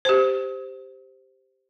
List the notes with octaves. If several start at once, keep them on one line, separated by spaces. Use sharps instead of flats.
G4 C5